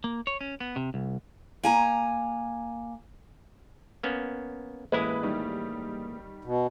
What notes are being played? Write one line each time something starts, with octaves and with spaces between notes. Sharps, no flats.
A#3
C#5
C#4
B3
C3
C2
A#3 G#5 A#5
A#3 B3 C#4
A1 G#3 A#3 E4 B4 D#6
D#3 G3
B2